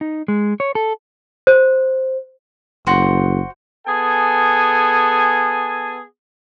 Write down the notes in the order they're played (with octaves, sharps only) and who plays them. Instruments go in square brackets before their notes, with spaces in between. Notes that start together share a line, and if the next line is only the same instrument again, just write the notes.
[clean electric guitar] D#4
G#3
C#5
A4
[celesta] C5
[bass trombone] F#1 [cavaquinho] F#4 C5
[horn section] B3 G#4 A4 G#5